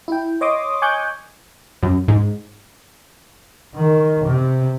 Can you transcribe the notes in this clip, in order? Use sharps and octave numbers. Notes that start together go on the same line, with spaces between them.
E4 G5
C#5 D#5 C6 D6 D#6
G#5 C#6 D6 F#6 G6
F#2
G#2
D#3
C3